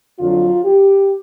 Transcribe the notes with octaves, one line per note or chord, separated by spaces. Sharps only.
F2 D3 F#3 F4
G4